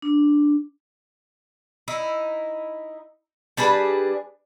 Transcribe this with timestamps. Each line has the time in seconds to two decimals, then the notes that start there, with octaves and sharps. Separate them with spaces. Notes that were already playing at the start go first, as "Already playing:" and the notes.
0.02 D4
1.88 D#4 E4
3.57 G3 D4 G#4 B4